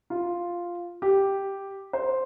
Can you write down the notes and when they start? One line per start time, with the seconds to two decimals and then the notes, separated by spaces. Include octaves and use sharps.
0.10 F4
1.02 G4
1.93 C5